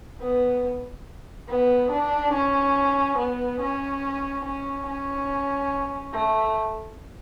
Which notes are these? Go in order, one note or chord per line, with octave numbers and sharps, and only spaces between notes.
B3
B3
D4
C#4
B3
C#4
C#4
C#4
A3